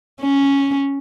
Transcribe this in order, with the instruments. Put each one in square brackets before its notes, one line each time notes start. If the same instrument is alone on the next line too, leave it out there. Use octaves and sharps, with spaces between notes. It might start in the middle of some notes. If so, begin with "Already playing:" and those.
[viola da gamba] C#4